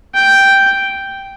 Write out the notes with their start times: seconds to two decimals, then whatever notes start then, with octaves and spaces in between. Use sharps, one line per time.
0.14 G5